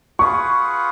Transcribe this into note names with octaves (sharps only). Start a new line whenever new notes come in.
F4 G#4 B4 F#5 C#6